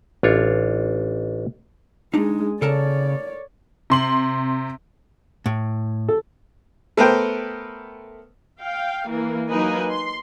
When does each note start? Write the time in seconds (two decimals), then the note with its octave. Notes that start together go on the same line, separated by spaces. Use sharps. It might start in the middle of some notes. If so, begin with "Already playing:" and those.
0.23 A1 D4 F4 C#5
2.14 G#3 D4 D#4 G#4
2.62 C#3 A4 A#4 C#5 D5 A5
3.90 C3 C6 F#7
5.46 A2
6.08 A4
6.97 A3 B3 A#4 C5 G5
8.59 F5 G5
9.09 E3 A#3
9.49 F#3 A#3 D#4 B4 D#5 G#5
9.90 C6